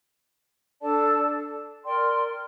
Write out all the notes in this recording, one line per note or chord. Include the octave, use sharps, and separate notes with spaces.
D4 A4 D5 A5
A#4 D5 G5 C6